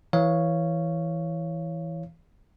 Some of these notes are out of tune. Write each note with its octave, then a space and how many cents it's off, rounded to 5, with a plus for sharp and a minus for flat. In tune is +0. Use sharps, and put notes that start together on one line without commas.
E3 +0 C#5 +0 F5 -15